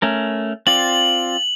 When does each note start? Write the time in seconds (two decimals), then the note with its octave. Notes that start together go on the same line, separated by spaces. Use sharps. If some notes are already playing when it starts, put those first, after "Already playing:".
0.02 A3 C#4 A#4
0.67 C4 F4 D5 F#7